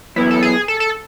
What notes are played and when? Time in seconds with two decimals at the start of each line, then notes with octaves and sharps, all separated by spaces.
0.16 F#2 E3 B3 E4
0.31 A4
0.43 G#4
0.68 A4
0.80 A4